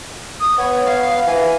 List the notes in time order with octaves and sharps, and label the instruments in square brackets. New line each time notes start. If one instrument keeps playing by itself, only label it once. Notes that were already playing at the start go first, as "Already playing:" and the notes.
[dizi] D#6
[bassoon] B3 [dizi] C#5
[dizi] F5
[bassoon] E3 [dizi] G#5